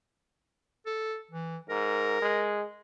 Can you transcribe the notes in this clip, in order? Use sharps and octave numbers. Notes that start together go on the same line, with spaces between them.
A4
E3
G#2 A#4
G#3